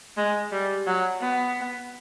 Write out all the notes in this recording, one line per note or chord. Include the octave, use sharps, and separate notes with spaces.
G#3
G3
F#3
B3